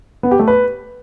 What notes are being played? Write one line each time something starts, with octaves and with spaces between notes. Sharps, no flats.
B3
G4
A3
B4